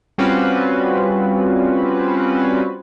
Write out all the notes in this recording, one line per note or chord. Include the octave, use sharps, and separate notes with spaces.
G3 C4 C#4 F4 F#4 B4